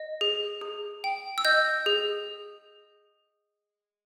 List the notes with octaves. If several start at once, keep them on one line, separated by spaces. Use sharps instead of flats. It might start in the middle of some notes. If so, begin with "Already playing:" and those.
Already playing: D#5
G#4
G#4
G5
E6
D#5 G6
G#4